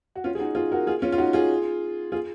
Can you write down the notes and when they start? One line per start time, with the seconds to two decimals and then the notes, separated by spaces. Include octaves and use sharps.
0.15 F#4
0.24 C#4 F4
0.35 G#4
0.39 D#4 F#4
0.55 F4 G#4
0.72 F#4 A#4
0.87 F4 G#4
1.02 C#4 F4
1.12 F4
1.18 D#4 F#4
1.33 F4 G#4
2.12 F4 G#4